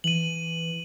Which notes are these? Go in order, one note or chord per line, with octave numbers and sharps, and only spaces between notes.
E3 D#7 F#7